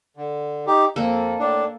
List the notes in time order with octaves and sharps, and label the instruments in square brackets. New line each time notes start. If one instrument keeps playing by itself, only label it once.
[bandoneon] D3
D#4 G4
[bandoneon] F2 [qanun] A#3 A4
[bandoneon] A2 D4